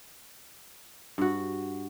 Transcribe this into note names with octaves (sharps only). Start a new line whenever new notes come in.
G2 F#4